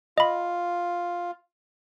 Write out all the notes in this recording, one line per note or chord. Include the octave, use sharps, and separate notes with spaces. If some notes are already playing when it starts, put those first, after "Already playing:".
F4 D#5 B5